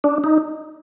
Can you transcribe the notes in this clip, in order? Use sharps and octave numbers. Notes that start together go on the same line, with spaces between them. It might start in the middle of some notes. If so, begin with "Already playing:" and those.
D4
D#4